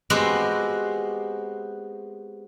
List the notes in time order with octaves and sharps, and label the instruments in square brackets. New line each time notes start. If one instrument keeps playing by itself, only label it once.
[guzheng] G#3 B3 C4 F#4 G4 C5